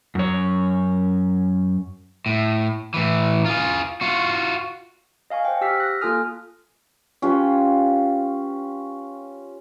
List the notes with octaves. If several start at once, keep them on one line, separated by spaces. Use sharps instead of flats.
F#2 C#5
A2
A2 E3
F4 G#4
F4 F#4
D#5 F5 G#5 C#6
C5 F#5 G5
G4 E6 F6 B6 C7
F#6 A#6
A#3 F4 A4 G#5 D#6 F6
C#4 F4 G4 B4